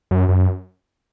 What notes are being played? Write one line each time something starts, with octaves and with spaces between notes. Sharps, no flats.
F#2
F#2